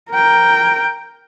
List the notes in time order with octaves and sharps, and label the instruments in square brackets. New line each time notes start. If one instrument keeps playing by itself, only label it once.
[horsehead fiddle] A#4 G5